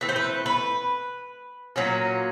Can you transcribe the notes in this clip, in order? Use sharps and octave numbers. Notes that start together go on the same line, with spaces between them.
E3 A3 C4 B4
C5
B4
B4
A#2 F#3 A#3 C#4